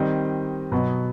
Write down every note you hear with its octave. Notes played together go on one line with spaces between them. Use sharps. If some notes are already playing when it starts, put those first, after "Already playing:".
Already playing: D#3 G3 C4 D#5
B2 F#3 B3 D#5